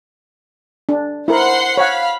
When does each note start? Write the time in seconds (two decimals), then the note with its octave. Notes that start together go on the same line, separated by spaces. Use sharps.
0.89 D4
1.28 E4 A#4 C5 F#5 C6
1.77 C#5 F5 F#5 B5